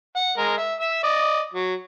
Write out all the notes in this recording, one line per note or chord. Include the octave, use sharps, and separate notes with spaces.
F#5
G#3 A#4
E5
E5 E6
D5 D#5
F#3